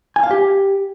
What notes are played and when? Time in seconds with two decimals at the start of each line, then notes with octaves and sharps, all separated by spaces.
0.16 G#5
0.23 F5
0.31 G4